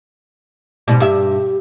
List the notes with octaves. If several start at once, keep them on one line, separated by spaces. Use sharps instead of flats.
G#2 B2 G3
G2 G4 E5